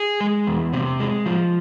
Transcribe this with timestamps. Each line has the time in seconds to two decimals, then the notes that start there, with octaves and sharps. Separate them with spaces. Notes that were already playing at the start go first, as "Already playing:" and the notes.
Already playing: G#4
0.20 G#3
0.47 E2
0.73 C3
1.00 G#3
1.26 F3